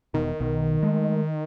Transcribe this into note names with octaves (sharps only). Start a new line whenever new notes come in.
E1 B2 D#3
B1 B2
G#3 A3